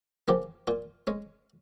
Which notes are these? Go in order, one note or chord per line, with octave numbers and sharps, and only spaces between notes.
C#3 F3 A#3 G4
A#2 F4
G#3 C#4